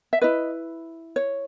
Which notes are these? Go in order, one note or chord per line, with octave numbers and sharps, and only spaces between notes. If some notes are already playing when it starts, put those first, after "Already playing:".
E5
E4 B4 D#5
C#5